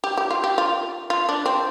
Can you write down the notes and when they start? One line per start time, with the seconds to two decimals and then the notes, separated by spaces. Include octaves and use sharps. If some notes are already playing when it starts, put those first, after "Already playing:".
0.04 G4
0.17 G4
0.31 F4
0.44 G4
0.58 F4
1.10 F4
1.29 D4
1.46 C4